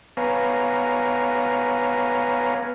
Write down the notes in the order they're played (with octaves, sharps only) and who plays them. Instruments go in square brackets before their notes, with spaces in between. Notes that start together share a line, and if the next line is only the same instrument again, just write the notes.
[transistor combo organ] B3 B4 C#5 F5 G#5 A#5